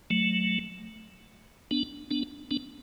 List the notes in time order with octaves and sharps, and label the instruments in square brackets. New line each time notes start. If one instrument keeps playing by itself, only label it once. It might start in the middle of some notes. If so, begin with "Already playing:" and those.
[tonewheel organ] F#3 A3
B3 D4
B3 D4
B3 D4